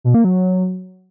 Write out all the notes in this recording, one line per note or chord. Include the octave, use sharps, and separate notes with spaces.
B2
A#3
F#3